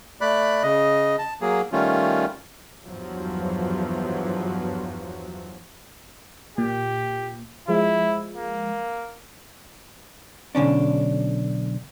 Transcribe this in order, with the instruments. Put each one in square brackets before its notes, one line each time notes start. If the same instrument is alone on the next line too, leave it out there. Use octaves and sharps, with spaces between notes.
[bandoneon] A3 D5 B5 F#6
C#3 D#5
A5
F#3 A#3 G#4
D#3 G3 A3 C#4 F4
[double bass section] E2 G2 F3 F#3
[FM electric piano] A#2 [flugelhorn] G4
[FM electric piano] F3 G#3 [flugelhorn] E4
[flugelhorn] A#3
[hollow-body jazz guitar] B1 D3 C#4 D4